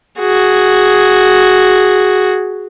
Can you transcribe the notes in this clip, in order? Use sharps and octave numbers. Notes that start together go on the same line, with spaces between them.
F#4 G#4